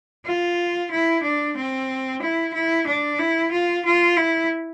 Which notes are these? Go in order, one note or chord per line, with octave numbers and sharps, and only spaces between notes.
F4
E4
D4
C4
E4
E4
D4
E4
F4
F4
E4